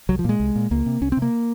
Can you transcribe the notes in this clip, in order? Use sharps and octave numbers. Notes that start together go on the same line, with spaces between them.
C2 F#3
F3
A#2 G#3
C2
A#2
C#2 A#3
C3
C2 C#4
C4
C3
A#3